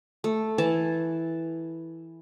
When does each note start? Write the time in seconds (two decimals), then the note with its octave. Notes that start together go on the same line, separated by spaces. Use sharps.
0.24 A3
0.58 E3 G#5 A5